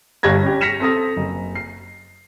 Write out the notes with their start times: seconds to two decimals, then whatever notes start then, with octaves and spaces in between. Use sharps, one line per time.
0.23 G1 G2 G#6 A#6
0.42 C#4 G4
0.61 A#6 B6 C#7 E7 F7
0.80 C4 A4 D#6 A#6
1.17 F#1
1.55 C7